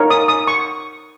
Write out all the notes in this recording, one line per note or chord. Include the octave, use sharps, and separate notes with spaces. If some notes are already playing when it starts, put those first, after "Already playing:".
Already playing: D#4 A#4 C#5
D#6
D#6
C#6